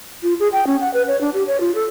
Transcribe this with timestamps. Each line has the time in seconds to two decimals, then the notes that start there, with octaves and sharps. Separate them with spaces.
0.23 F4
0.40 G#4
0.53 G5
0.67 C#4
0.81 F#5
0.94 B4
1.08 C#5
1.21 D4
1.34 G4
1.47 C#5
1.60 F4
1.75 A4